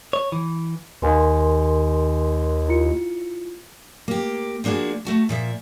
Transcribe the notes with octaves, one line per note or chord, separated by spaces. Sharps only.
C#5
E3
D#2 A#4 B4 G#5 C6
E4 F4 C#7
A#3 G4
F3 A#3 D4 F#4 G#4
A3 F#4 A5
A#2 F3 E5